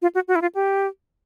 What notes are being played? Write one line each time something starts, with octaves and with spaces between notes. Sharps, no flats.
F4
F#4
F#4
E4
F4
G4